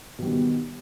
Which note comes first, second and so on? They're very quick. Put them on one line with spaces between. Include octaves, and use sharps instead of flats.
B2 G3 D#3 B3